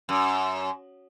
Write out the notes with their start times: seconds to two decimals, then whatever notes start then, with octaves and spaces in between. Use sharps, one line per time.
0.09 F#2